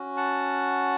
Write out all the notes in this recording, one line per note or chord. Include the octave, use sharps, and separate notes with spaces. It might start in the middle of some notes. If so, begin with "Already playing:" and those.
Already playing: C#4 F#4
F#5 A5